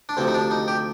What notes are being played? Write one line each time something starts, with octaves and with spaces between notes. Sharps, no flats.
D4
D2 C3 F3 C4
D#4
D4
D#4
G4